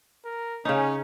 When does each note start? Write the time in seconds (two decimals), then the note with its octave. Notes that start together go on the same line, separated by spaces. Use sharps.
0.25 A#4
0.65 C#3 C#4 D#4